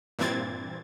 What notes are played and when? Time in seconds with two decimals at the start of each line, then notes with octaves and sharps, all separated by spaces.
0.19 G2 A#2 E3 C4 G#6 A6